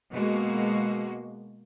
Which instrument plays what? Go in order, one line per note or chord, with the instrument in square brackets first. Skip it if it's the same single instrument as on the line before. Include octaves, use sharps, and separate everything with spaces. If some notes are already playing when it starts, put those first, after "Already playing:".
[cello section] B2 G#3 A#3 F#4